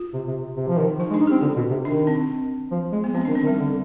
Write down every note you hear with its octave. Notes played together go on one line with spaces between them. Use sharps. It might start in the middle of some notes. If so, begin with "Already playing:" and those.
Already playing: F4
C3
C3
C3
F3
D#3
F3 D#4
G#3
D4
D#4
C4 G4
D3 F4
B2
C3
D#3 D4
C4
F3
G#3
B3
F3 C4
D#3 D4
C4
D#3
G3
D3